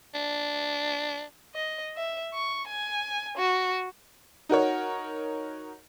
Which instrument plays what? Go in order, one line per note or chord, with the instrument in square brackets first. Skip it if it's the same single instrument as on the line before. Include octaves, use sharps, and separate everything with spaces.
[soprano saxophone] D4
[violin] D#5
E5
C#6
G#5
F#4
[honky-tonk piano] D#4 F#4 A#4 C#5